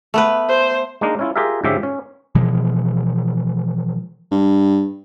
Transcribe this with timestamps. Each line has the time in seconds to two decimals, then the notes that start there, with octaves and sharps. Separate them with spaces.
0.14 A3 B3 B4
0.49 C5
1.01 G#3 A#3 D4 D#4 A#4
1.19 C#4 E4 F4
1.36 F4 G4 G#4 A#4 E5
1.64 G#2 D3 F3 C#4 G4 E5
1.83 C#4
2.35 B2 E3 F3 G#3
4.31 G2